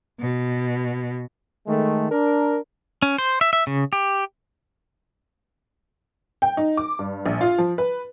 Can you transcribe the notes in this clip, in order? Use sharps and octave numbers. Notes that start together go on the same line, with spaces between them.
B2
D#3 G#3 A3
D4 A#4
C#4
C5
E5
E5
C#3
G4
G5
D#4
D6
G2
A#1
F4
F3
B4